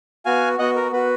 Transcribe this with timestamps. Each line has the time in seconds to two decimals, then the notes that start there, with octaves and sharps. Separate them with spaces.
0.25 B3 F#4 F5 G#5
0.59 B3 F#4 D#5 F#5
0.76 A#4
0.92 B3 F#4 B4